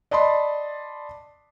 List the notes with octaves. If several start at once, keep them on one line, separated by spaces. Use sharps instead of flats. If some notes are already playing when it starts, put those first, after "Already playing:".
D5 D#5 A5 B5 C6